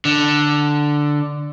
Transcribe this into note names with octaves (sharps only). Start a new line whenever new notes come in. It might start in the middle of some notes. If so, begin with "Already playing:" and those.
D3